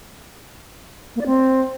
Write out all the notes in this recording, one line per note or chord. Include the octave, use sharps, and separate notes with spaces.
A#3
D5
C4